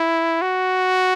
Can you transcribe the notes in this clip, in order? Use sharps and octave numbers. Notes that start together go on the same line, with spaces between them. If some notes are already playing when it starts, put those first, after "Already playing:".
Already playing: E4
F#4